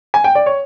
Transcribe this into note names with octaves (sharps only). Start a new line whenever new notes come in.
G#5
G5
D5
C#5